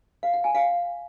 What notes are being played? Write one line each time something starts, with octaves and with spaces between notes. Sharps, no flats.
F5
F#5
G#5
F5